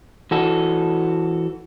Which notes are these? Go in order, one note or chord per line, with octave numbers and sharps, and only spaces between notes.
E3 F#4 A4